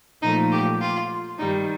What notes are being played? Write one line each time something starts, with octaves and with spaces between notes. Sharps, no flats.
A#2 F3 A3 D#4
G4
F4
G2 D#3 G3 D#4